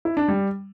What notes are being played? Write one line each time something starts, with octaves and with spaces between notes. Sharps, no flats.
E4
D4
G3